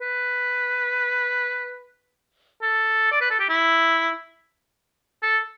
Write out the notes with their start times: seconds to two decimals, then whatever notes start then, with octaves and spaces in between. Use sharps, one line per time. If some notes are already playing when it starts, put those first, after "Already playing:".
0.01 B4
2.62 A4
3.12 D5
3.21 B4
3.30 A4
3.40 G4
3.49 E4
5.23 A4